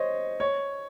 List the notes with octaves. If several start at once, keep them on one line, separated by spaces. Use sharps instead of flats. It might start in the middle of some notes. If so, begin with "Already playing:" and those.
Already playing: C5 C#5 D#5
C#5